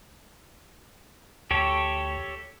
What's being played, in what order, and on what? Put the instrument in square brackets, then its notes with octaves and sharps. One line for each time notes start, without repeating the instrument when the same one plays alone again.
[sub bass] D2 [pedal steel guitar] G4 A4 C#5